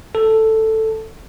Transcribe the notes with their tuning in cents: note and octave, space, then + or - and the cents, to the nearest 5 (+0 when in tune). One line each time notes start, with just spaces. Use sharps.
A4 +5